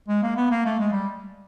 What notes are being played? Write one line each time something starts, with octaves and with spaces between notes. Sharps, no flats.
G#3
A#3
B3
A#3
A3
G#3
G3